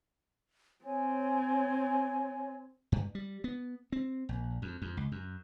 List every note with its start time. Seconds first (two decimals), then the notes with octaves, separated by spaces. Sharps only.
0.85 C4 C#5 G#5
2.92 G2
3.15 G3
3.44 B3
3.92 C4
4.29 A#1
4.62 F2
4.82 F2
4.97 C#2
5.12 F#2